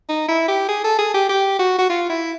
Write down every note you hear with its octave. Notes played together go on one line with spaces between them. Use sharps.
D#4
E4
G4
G#4
A4
G#4
G4
G4
F#4
F#4
F4
E4